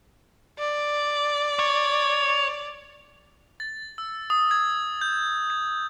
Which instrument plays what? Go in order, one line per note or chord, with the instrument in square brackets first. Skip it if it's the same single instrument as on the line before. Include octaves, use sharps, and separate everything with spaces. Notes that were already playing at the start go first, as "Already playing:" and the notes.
[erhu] D5
[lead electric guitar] C#5
[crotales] A6
E6
D#6
G#6
G6
G#6